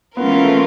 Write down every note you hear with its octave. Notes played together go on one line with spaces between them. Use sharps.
E3 G#3 B3 C#4 F4 A#4
A#3
A3